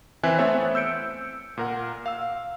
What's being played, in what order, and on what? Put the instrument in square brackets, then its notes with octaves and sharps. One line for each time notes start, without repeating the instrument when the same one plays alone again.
[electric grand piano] E3 C4 E5 G#5 F#6
A3 B3 C4 A4 C#5 E5
E6 G6 C#7 D7
A#2 A#4 F#5
F5 E6